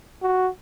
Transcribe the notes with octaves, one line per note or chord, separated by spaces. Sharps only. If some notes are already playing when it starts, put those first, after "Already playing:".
F#4